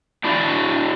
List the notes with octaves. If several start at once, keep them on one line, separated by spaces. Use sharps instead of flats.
D4 E4 F#4 D5